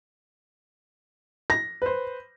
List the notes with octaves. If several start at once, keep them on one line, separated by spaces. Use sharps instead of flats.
A#6
B4 C5